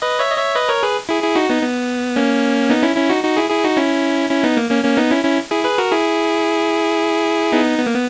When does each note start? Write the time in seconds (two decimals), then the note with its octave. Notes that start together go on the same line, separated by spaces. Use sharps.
0.02 B4 D#5
0.19 C#5 E5
0.31 D#5
0.37 C#5 E5
0.55 B4 D#5
0.69 A#4 C#5
0.83 G#4 B4
1.09 E4 G#4
1.22 E4 G#4
1.35 D#4 F#4
1.49 B3 D#4
1.62 B3
2.16 A#3 C#4
2.69 B3 D#4
2.83 C#4 E4
2.96 C#4 E4
3.09 D#4 F#4
3.24 D#4 F#4
3.37 E4 G#4
3.50 E4 G#4
3.64 D#4 F#4
3.77 C#4 E4
4.30 C#4 E4
4.43 B3 D#4
4.57 A#3
4.70 A#3 C#4
4.84 A#3 C#4
4.97 B3 D#4
5.11 C#4 E4
5.24 C#4 E4
5.51 E4 G#4
5.64 G#4 B4
5.78 F#4 A#4
5.91 E4 G#4
7.52 B3 D#4
7.78 B3
7.86 A#3
7.94 B3